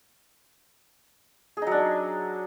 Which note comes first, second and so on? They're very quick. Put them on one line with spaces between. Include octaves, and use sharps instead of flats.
G#4 D#4 F#3 D4